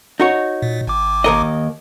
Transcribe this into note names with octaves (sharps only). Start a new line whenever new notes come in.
D#4 F#4 C#5
A#2
G#1 D6
D#2 A#4 D#5